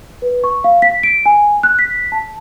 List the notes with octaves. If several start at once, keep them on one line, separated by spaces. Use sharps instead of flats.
B4
C#6
F5
B6
D7
G#5
F#6
B6
A5